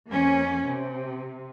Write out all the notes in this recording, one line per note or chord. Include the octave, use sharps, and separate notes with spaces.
F2 A#3 C#4
C3